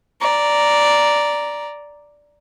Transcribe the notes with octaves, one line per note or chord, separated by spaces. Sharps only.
D5 A#5